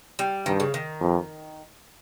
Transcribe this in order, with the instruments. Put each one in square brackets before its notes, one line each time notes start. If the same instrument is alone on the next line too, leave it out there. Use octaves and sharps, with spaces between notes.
[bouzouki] G3
[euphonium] G2 [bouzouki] D#3
[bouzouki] C#3
D#3
[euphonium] F2